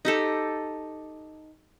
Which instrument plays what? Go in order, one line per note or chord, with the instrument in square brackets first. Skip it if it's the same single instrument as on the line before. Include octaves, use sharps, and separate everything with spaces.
[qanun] D#4 G4 A4